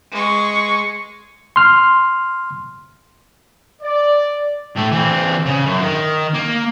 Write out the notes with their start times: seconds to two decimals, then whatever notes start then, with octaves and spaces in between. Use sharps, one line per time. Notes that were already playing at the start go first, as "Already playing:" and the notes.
0.11 G#3 C#6
1.56 C6 F6
3.82 D5
4.77 A2 A3
4.92 E3 C4
5.46 C#3
5.66 F#2
5.81 D#3
6.34 A#3